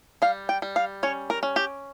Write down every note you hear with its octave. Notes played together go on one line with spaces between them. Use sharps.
G3 F5
G5
G3
F5
C#4 C#5
A#4
C#4
G4